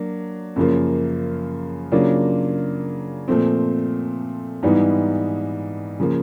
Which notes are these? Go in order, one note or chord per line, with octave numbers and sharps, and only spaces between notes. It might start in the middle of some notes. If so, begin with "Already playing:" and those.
Already playing: F#3 A#3 D4
F#2 C#3 F3 A#3
C#3 F#3 A#3 D4 F4
A#2 F3 A3 C4
G#2 E3 G3 B3 D#4
C#3 F3 A#3